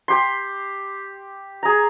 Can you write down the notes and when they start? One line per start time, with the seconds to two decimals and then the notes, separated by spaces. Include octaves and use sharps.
0.08 G4 C6
1.63 G#4 A#5